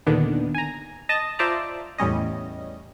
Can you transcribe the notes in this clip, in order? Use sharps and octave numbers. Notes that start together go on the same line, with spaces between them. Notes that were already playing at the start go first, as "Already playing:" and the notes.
D#2 A#2 D3 D#3 B3 D4
G#5 A#5
D#5 A5 D#6 A#6
F4 C5 D5 E5 A5 A#5
E2 A2 G3 C#4 D#5